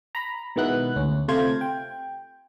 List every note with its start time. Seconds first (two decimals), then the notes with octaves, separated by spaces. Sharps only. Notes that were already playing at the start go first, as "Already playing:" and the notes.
0.15 A#5 B5
0.56 B2 D#3 G#3 B3 E4 F#6
0.96 D2 C#4
1.28 C3 A3 F4 C5 F5 G#6
1.61 G5